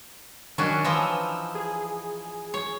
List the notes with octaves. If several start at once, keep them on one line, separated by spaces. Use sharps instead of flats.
D#3 F#3 C#4 D4
E3 F3 D#4 E6
G#4
C#5